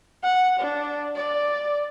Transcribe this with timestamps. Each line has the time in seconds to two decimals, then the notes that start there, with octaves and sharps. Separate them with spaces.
0.24 F#5
0.60 D4
1.16 D5